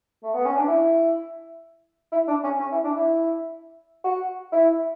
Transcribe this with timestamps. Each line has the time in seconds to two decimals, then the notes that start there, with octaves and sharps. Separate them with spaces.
0.23 A3
0.34 B3
0.45 C#4
0.57 D4
0.67 E4
2.12 E4
2.27 D4
2.44 C#4
2.60 C#4
2.72 E4
2.84 D4
2.96 E4
4.04 F#4
4.52 E4